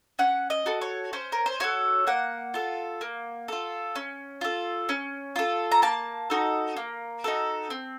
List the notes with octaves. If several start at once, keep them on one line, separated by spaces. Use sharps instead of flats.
C#4 F#5
D#5
F#4 A4
C#5
C#4 C5
A#4
C5
F#4 A4 C#5
A#3 F#5
F4 A4
A#3
F4 A4
C#4
F4 A4
C#4
F4 A4
A#5
A#3 A5
D#4 F#4 A4
A#3
D#4 F#4 A4
C4